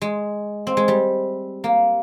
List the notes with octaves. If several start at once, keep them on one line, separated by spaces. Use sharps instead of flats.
G#3
C4
G#3
G3
A#3